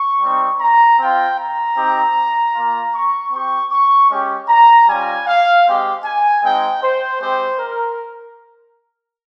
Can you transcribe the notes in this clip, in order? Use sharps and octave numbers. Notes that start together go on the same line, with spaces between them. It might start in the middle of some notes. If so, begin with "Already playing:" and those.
Already playing: C#6
G3 C4 D#4
A#5
C4 F4 G5
A#5
C4 D#4 G4
A#3 F4
C#6
C4 G4 C#6
C#6
G#3 C#4 G4
A#5
G3 C#4 F4 G#5
F5
G#3 C4 G4
G#5
G#3 C4 D#4 G5
C5
G#3 C4 G4 C5
A#4